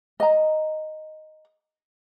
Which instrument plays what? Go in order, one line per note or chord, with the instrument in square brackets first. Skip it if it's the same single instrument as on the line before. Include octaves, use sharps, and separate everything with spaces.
[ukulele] D#5 A#5